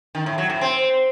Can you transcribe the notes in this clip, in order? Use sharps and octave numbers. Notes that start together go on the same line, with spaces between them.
D#3
A2
F#3
A2
C4